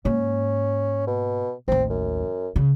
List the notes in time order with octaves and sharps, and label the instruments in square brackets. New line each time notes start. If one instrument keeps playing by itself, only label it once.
[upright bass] G#2 A#3 [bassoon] C#4
[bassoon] B2
[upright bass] A1 D#2 [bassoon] C4
[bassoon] F#2
[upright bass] C#3